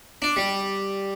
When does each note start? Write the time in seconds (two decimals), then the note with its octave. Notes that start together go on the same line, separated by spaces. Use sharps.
0.22 D4
0.36 G3